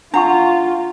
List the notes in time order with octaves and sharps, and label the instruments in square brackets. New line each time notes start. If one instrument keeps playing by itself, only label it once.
[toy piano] D4 F#5 C#6 [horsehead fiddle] F4 [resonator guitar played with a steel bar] A#5